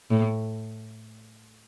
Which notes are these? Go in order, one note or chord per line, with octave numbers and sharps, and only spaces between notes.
A2